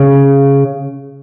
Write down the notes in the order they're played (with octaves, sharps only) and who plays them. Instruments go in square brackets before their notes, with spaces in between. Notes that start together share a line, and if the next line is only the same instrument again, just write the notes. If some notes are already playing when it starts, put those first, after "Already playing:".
Already playing: [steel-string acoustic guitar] C#3